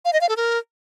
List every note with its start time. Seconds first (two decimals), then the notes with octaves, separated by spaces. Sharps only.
0.05 F5
0.13 D#5
0.21 F5
0.29 A4
0.37 A#4